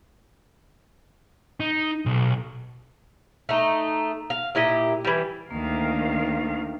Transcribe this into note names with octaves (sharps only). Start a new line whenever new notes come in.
D#4
B1
A3 D#4
F5
A#2 E4 G4 D#5
E3 G3
D2 D#3 A#3 F5